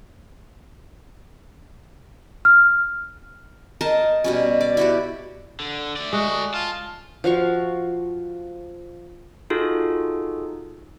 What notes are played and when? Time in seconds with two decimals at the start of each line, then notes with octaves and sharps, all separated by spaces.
2.45 F6
3.81 A#4 C5 D#5 A5
4.24 B2 G3 C#4
4.61 D5
4.77 E4 F#4 G4
5.60 D3
5.96 A3 D5
6.13 G#3 F#4
6.54 F4 A5
7.24 F3 F#4 F5 C#6
9.50 D#4 F4 F#4 G#4 A4